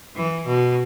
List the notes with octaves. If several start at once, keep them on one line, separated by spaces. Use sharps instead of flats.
E3
B2